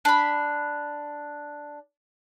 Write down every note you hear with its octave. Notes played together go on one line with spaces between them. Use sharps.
D4 B5